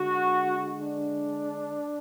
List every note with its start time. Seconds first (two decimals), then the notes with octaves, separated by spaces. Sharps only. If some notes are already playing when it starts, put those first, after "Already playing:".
Already playing: D3 G#3 F#4
0.81 D4